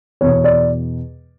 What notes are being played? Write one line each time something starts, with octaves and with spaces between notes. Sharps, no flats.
E2 B2 C#5
D5